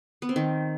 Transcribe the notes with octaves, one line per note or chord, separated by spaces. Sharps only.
B3
C4
D#3